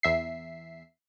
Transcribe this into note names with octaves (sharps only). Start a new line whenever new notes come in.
E2 E5 C7